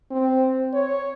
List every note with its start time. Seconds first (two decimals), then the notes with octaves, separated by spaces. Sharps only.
0.11 C4
0.74 C#5